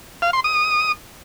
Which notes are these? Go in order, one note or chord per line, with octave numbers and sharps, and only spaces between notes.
F5
C6
D#6